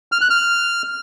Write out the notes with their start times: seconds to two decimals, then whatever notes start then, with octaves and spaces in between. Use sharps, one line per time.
0.12 F6
0.21 F#6
0.30 F6